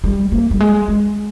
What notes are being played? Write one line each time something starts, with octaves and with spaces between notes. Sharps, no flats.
G3
A#3
G3
G#3
G#3